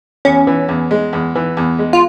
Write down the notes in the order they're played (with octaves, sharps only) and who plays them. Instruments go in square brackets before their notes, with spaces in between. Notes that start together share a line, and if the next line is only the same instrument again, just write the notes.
[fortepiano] E2 [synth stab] C#4
[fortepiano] E3
E2
G#3
E2
E3
E2
G#3
[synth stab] F4